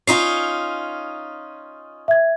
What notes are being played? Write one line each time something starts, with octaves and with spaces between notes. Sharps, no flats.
C#4 D#4 F4 C7
E5 G#6